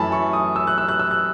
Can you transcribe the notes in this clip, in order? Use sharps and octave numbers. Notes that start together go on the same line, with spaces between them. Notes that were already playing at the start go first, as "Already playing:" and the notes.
Already playing: F#2 E3 A3 G#5 A5 B5
C#6
D#6
E6
F#6
E6
F#6
E6
F#6